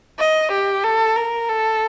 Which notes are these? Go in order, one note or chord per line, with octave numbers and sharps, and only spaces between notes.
D#5
G4
A4
A#4
A4